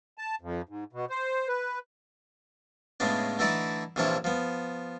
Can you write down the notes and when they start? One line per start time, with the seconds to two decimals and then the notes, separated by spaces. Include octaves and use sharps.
0.18 A5
0.41 F2
0.69 G#2
0.93 B2
1.10 C5
1.48 B4
3.00 A2 C#3 G#3 B3 D4
3.39 D3 E3 A3 D#4 E4 D5
3.96 A#1 C3 E3 F3 D4 C#5
4.24 F3 B3